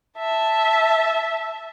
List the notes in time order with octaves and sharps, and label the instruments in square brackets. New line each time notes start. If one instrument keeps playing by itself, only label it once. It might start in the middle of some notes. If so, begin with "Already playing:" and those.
[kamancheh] E5 A5